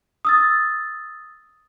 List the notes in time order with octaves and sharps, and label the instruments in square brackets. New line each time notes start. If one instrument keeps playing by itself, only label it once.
[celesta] D#6 E6 A6